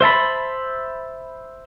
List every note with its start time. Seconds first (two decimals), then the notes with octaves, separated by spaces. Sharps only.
0.01 C5 E5 A5 B5